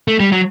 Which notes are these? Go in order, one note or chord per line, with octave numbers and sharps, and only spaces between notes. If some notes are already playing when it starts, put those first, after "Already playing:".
A3
G3
F#3